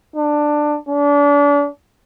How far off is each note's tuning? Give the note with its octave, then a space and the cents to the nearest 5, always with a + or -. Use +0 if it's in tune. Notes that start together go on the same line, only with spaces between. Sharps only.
D4 +15
D4 -35